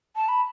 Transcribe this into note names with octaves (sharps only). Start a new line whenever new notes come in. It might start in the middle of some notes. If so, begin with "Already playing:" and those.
A5
B5